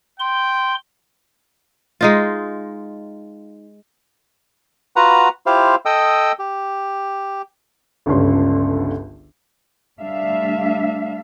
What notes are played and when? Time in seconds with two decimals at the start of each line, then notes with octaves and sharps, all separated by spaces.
0.20 G5 C6
2.01 G#3 D#4 F4
4.96 F4 F#4 B4 F#5 A#5
5.46 E4 F4 G4 C5 F5
5.86 A4 D#5 G5 D#6 E6
6.39 G4
8.06 G1 C#2 G2 D3 C#4 C6
10.00 G3 A3 D4 E5 F5